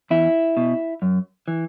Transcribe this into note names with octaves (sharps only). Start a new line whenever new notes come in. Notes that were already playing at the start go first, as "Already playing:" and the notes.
E2 E4
B2
F#2
E3